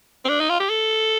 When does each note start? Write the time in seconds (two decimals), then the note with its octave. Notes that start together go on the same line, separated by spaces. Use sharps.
0.25 C4
0.29 D4
0.40 D#4
0.50 F4
0.60 G4
0.69 A4